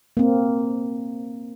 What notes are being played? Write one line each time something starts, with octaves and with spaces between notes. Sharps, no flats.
A#3 C4